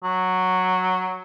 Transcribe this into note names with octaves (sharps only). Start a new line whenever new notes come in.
F#3